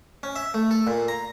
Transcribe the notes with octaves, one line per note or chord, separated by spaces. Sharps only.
C#4
E5
A3
A4
A#2
A#5